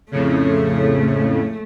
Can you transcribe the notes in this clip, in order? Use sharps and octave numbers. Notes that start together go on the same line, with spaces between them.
F2 A2 C#3 A3